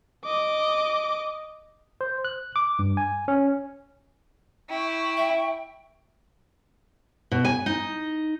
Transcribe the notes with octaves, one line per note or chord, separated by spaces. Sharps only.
D#5 D6
C5
F#6
D6
G2
G#5
C#4
E4 G5 C#6
E5
B2
G#5
D#4